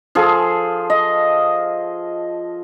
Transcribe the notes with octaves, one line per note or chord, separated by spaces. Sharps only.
F3 G#4 A4
D#5